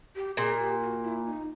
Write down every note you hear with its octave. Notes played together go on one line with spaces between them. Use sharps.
G4
A#2 G#4
G4
F#4
E4
D#4